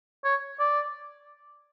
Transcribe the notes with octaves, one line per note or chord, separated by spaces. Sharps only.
C#5
D5